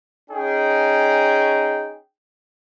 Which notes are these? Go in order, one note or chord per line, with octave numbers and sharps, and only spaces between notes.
C#4 D#4 G#4 G5